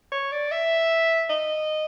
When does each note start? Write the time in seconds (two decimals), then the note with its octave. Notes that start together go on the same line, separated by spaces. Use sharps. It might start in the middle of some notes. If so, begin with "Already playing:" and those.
0.12 C#5
0.32 D5
0.51 E5
1.30 D#5